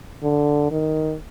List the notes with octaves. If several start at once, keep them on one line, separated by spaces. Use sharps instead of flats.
D3
D#3